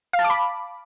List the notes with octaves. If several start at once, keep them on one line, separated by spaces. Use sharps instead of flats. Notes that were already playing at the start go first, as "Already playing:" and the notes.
F5
A5
D6
B5